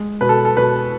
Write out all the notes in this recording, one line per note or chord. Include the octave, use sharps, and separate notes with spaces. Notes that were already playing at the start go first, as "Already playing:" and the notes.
Already playing: G#3
B2 B4
A4
A4
B2 B4